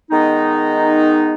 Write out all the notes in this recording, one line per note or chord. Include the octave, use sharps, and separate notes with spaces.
D#3 G#3 B3 D#4